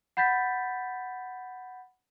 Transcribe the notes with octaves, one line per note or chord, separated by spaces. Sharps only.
F#5 B5 G6 A6 B6